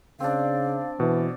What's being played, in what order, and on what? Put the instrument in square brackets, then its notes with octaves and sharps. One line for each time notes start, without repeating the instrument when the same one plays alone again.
[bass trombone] C#3 [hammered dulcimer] C4 D4 [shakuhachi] F5
[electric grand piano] B2 [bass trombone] E3